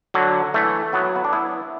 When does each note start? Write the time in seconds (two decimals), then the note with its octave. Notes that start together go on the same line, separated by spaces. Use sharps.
0.14 D3 F#3
0.54 E3 A3
0.93 F#3 B3
1.16 B3
1.25 D4
1.33 B3 E4